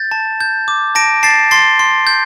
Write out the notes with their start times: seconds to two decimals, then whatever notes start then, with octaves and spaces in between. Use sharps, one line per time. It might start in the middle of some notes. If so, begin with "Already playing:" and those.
Already playing: G6 A6
0.11 A5
0.40 G6
0.68 D6
0.95 A5 A#6 D7
1.23 A5 A6 C7
1.51 C6 A6 C7
1.79 C6
2.07 G6